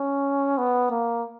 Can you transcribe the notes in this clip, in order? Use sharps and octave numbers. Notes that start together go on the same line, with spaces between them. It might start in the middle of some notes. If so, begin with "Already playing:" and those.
Already playing: C#4
B3
A#3